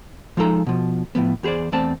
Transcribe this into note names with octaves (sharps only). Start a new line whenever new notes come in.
F3 G#3 D#4 A4 A#5
B2 F3
A2 F3 B3
E2 G4 G#4 C5 D5
E2 A3 C4 D5 A5